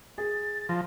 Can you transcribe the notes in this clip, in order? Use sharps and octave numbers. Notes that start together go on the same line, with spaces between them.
G#4 A6
F3 A#6